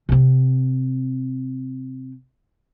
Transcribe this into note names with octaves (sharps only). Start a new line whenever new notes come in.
C3 C4